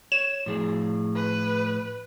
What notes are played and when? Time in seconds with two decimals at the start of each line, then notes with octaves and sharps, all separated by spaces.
0.12 C#5 E7
0.46 A2 F3 G#4
1.15 B4